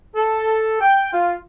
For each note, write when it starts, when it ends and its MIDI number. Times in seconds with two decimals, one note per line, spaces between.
0.16 0.79 69
0.81 1.10 79
1.13 1.35 65